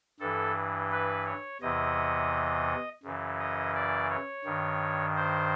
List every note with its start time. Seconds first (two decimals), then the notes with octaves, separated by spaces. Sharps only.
0.20 G2 E3 A4
0.91 B4
1.26 C#5
1.61 E2 C3 E3 D#5
3.03 F#2 C#3 E3
3.39 D#5
3.75 D5
4.10 C#5
4.44 G2 D#3
5.16 C5